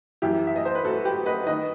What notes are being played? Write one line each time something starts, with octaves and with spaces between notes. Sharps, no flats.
F#2 E3 E4 G4
E5
D#5
C5
B4
F#4 A4
G4 B4
B4 D#5
D#3 B4 D#5